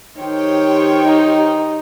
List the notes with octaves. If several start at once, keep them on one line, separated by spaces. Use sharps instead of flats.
D#3 G4 C5 C#5 G5
D#4